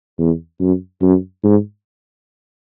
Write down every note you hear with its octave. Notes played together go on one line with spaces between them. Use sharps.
E2
F#2
F#2
G#2